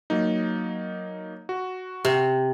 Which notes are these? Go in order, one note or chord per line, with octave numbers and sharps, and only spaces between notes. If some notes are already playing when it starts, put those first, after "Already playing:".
F#3 A#3 D#4
F#4
C3